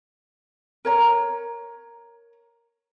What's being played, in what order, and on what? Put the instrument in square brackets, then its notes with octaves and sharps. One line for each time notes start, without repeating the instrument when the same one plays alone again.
[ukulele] A#4 C#5 A#5